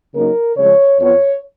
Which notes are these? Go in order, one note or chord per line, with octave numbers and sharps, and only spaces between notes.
C#3 F#3 A#3 D#4 A#4
C#3 F3 G#3 C#4 C#5
F2 F3 B3 C#5